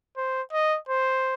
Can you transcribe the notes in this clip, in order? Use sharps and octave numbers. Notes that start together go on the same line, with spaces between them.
C5
D#5
C5